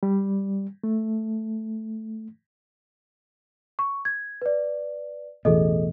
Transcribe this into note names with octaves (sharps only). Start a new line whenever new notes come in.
G3
A3
C#6
G#6
B4 D5
A1 E2 B2 G#4 A4 D#5